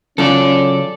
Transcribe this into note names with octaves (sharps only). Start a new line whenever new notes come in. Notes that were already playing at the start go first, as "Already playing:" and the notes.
C#3 F#3 C#4 F4 A4 D5